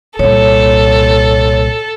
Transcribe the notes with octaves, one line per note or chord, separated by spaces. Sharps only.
C2 A#2 A4 C#5